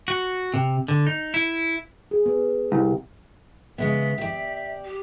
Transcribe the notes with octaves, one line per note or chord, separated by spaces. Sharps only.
F#4
C3
D3
D#4
E4
G#4
B3
C2
C#3 G#3 B3 E5
G4 D5
G4